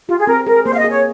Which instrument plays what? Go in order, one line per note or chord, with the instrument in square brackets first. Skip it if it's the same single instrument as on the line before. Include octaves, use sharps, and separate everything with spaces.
[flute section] F4 [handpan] G4
[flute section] G#4
[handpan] C4 [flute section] A#4
[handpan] G#4 [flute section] A#4
[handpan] A#3 [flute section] C5
[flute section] F5
D#5
[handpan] G#4
[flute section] C#5